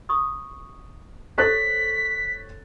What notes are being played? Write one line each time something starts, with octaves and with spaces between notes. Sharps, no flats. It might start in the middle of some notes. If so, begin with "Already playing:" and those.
B5 C#6 D#6
A4 C5 C#5 F#6 A6 B6